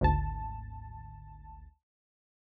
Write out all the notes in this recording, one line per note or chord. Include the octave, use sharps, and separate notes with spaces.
G#1 D2 A5